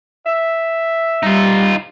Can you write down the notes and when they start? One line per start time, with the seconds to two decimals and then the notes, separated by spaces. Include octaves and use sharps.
0.26 E5
1.23 G3 D#4 F4